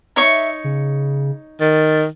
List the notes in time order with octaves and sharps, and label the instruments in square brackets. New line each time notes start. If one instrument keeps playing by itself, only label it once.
[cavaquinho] D#4 C#5 C#6 [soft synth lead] E5
[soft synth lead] C#3
[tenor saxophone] D#3 [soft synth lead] A6